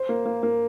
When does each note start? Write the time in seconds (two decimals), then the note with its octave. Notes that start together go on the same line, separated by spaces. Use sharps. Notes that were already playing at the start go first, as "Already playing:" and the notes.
Already playing: C5
0.09 A#3
0.26 A#3
0.43 A#3